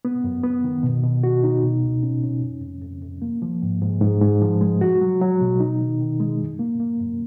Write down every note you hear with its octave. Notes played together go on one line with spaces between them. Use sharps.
B3
F#2
B3
D#3
B2
B2
F#4
D#4
B2
C#2
C#4
C#4
F2
F2
F2
F2
A#3
F3
G#2
G#2
G#2
G#2
F3
G#3
F#4
F#3
F#3
B2
D#4
D#3
D#3
G#3
F#2
A#3
A#3
F#2